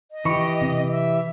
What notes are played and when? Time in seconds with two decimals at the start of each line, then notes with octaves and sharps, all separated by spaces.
0.11 D#5
0.25 E3 G4 B5 C#6 C#7
0.62 C3
0.91 E5